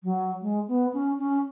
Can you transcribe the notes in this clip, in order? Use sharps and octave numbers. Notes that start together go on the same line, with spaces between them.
F#3
G#3
B3
C#4
C#4